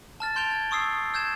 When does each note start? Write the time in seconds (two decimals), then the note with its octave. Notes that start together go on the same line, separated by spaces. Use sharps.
0.20 A5 F6 A6
0.36 C6 G6 D7 F7 G7
0.51 G#6
0.71 C6 C#6 D#6 E6 C7
1.14 E6 G6 G#6 E7